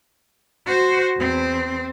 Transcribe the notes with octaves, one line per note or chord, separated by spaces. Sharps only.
F#4 C5
E2 C4